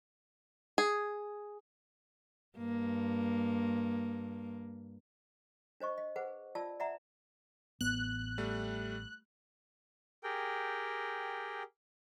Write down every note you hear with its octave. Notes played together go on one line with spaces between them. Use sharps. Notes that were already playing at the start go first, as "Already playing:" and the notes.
G#4
G2 A#3
D4 C5 D#5 C#6
D#5
G#4 B4 C5 F#5
F4 D5 A5 E6
D5 E5 F#5 A#5
A1 B3 F#6
G3 A3
G4 G#4 A#4 G5